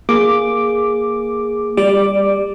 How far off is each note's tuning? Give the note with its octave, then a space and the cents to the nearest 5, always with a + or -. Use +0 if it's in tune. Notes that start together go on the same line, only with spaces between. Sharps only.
A#3 +0 G#4 +0 D6 +0
G3 +25 D5 +0 D6 +0